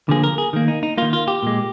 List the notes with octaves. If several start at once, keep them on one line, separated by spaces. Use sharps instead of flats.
D3 F3 A#3 G#4
A#4
G#4
D#3 A#3
D#4
D#4
D#3 A#3 F4
F4
G4
A#2 G#3